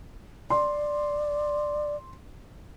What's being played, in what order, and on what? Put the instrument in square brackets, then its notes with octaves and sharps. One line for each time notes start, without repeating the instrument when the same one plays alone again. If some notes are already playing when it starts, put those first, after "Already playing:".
[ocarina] D5 [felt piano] C6